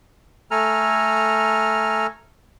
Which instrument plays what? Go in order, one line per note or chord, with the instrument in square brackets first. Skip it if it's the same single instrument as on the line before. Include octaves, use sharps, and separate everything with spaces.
[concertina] A3 A4 G#5 A#5 F6